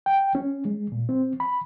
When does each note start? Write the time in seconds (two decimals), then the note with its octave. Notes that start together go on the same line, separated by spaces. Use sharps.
0.06 G5
0.35 C#4
0.65 G#3
0.92 A#2
1.09 C4
1.40 B5